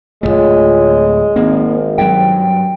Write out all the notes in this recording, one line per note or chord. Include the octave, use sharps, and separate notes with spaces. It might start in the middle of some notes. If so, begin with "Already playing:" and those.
D1 F2 G#3 A3 F4 C#5
G#1 A#3 C4
G2 F#3 G5